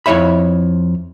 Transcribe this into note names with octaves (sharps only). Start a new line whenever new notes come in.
F2 E4 C#5 E5 B5